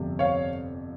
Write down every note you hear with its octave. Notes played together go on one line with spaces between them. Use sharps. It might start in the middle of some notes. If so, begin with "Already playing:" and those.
Already playing: G1 F2 C3
C#5 F5